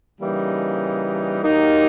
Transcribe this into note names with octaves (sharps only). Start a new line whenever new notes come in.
C#3 E3 G3 A#3 D#4
F#3 A#3 D#4 G4